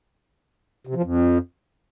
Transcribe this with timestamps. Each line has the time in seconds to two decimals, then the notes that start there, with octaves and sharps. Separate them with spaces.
0.87 C3
0.95 F3
1.03 F2